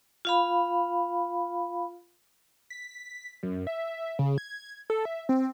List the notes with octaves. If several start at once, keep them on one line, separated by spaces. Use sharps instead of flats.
F4 F5 B5
B6
F#2
E5
C#3
G#6
A4
E5
C4